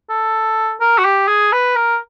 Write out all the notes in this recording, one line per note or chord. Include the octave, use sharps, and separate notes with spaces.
A4
A#4
F#4
G4
G#4
B4
A#4